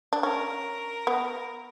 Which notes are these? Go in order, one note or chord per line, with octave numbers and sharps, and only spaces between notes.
D4
C#4 A#4
B3